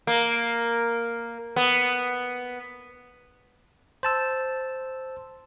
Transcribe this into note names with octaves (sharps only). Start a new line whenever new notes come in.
A#3
B3
C5 A5 E6